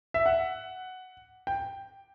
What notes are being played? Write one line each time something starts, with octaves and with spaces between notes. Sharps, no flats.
E5
F#5
G5